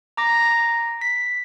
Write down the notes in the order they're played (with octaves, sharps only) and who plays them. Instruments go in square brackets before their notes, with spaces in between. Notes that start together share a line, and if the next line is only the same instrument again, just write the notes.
[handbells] A#5 D6 A#6
B6